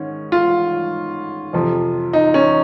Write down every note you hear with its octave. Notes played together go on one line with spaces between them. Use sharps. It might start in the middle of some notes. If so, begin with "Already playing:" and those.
Already playing: G#2 D#3 C#4
F4
F2 C3 F3
D#4
C#4